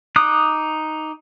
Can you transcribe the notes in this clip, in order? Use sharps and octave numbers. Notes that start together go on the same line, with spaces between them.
D#4 D6 D#6 F#6